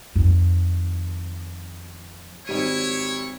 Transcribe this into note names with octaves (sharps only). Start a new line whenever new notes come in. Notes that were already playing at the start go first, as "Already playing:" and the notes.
F2 D#3
G#1 G3 E4 C#5 D#7